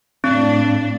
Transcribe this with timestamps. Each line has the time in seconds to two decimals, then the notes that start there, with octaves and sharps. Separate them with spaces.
0.24 A2 C4 D4